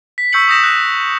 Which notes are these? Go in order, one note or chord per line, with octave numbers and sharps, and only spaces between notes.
B6
C#6 E6 G6 B6 C#7 F#7
D#6 G6 A#6 E7 F#7
F#6